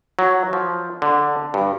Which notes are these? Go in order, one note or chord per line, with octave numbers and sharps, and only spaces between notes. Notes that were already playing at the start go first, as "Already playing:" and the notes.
F#3
F3
D3
G2